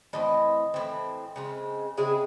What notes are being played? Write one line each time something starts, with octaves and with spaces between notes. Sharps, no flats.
A2 E3 C4 D#5
A2 E3 C4
C#3 G#3 C4
C#3 G#3 C4 E4 G#4